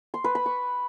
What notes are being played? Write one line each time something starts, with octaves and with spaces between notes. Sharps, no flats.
C6
B4
B5
C#6